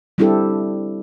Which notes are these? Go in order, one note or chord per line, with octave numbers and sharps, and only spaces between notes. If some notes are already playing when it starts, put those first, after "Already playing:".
G3 C4 D4 E4 G4 A4